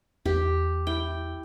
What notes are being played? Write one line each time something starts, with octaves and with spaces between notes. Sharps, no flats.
E2 G4
E4 G5